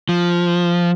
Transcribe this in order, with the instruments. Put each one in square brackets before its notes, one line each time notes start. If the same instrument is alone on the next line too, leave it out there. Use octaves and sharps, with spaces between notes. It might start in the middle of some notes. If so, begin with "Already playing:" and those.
[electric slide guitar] F3